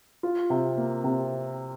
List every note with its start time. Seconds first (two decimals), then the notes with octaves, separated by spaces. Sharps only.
0.23 F4
0.50 C3
0.77 A#3
1.04 C3